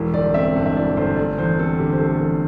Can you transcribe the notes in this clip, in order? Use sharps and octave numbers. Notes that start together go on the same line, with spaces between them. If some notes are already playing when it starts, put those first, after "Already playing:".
Already playing: E1 E3
G1 D5
C4 E5
G2
E5
E3 D5
G1 C5
A3 D5
E2 C5
C4 A4
D3 G4
C5
A3 A4
E2 A4